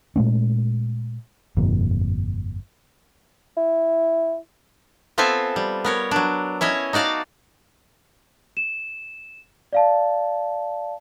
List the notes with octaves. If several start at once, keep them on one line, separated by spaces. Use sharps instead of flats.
A#2 G#3 A3 C#4
G1 F2 A#2
E4
B3 C4 F4 A4 E5 G#5
G3
B3 A#4 C#5
F#3 D4
C#4 E4 C#5 D#5
D#4 F#4 D5 F5 A5
E7
D5 F5 A5